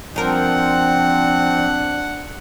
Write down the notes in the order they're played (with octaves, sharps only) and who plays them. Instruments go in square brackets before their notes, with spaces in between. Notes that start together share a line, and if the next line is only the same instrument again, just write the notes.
[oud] F3 A#4 [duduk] C4 [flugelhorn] D4 [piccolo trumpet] F#5